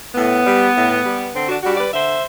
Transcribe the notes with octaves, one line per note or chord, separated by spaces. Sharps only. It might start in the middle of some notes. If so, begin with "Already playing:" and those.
A2 B3
G3
A2
G3
D3 C4
D4 F#4
G3 D4 F#4
B4 D5
D3 C5 E5